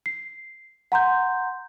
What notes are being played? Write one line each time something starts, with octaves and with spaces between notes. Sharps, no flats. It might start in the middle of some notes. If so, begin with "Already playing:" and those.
C7
F#5 A#5 C6 G6